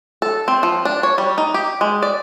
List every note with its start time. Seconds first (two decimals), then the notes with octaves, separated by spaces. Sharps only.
0.22 A4
0.48 C4
0.63 F3
0.85 D4
1.03 C#5
1.18 G3
1.38 D#4
1.54 G4
1.81 G#3
2.03 D5